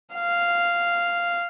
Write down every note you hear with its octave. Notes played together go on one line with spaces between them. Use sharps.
F5